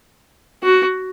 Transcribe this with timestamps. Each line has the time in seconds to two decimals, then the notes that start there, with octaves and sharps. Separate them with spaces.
0.63 F#4